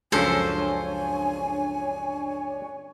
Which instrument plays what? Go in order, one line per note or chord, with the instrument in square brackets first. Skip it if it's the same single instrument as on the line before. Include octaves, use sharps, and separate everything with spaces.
[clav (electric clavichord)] C#2 F#2 F3 [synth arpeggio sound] D4 C#5 [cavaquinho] A4 C5 [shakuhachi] G#5